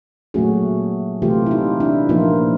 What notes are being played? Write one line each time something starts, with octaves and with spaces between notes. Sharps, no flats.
A#2 F#3 A3 C#4 F#4 G#4
C3 E3 A3 F4 G4
E4
D#4 F4
D4 E4
A#2 F3 A#3 D#4 F4